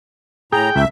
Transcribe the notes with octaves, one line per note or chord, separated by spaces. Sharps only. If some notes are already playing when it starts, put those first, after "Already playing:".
A2 G#4 G5 A#5
C#2 E5